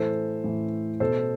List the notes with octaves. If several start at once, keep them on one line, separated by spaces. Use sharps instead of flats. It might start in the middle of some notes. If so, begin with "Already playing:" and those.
Already playing: A2 E3 A4 C5
A2 E3
B2 A4 C5